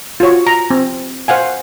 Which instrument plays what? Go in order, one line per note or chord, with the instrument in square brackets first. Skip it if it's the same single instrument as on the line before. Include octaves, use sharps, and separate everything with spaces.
[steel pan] F4 F#4 C#5
A#5
C4
C5 F5 F#5 G#5